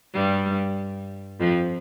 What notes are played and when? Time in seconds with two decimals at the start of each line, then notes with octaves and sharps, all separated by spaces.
0.14 G2 G3
1.40 F2 F3